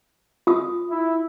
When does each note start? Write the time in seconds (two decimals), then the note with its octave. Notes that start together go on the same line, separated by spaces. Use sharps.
0.47 F4 D#6
0.91 E4